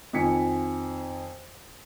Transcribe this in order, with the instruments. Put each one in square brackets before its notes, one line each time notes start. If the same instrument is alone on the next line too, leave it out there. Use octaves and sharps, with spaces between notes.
[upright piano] F2 D#3 F3 G#5 B6 C#7